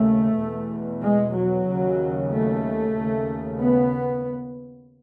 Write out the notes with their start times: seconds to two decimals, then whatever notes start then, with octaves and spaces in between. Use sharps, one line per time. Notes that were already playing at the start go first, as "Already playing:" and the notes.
Already playing: D#2 C#3 A3
0.37 E2 B2
1.03 G#3
1.35 F#3
1.67 D#2 C#3
2.31 A3
2.95 D#2
3.00 C#3
3.59 B3